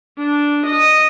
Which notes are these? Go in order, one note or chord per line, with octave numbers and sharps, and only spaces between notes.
D4
D#5